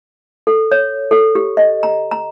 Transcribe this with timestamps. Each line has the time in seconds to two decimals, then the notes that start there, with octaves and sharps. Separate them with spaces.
0.47 A4
0.71 C#5
1.11 A4
1.35 G4
1.57 D#5
1.83 A#5
2.11 A#5